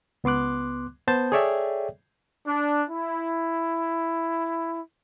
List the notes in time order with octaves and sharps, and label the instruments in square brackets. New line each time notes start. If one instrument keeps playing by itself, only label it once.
[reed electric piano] C#2 B3 C6 D6 F#6
B3 C5 A5 G6
G#4 A4 C#5 D5 E5 G5
[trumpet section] D4
E4